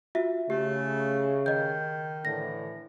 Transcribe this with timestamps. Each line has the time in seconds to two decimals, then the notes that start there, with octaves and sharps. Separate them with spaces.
0.15 F4 F#4 E5
0.50 C#3 A3 G4
1.46 D#3 D#5 G6
2.25 A2 D3 E3 A#6